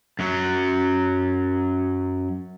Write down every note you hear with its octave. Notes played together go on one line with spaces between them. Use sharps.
F#2 F#3